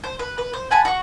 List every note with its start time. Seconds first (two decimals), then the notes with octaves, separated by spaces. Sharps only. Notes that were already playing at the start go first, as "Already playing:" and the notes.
0.04 C5
0.19 B4
0.38 B4
0.53 C5
0.71 F#5 G#5 A5 B5
0.85 F#4 C#6